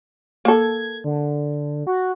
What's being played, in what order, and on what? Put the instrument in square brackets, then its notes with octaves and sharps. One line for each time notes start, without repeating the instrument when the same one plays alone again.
[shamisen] A#3 A4 [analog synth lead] G#6
[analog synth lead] D3
F#4